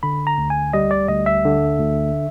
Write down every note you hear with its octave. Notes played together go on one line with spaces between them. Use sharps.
D3 B5
A#5
D2
G#5
G3 D#5
D5
D2 D#5
E5
D3
D2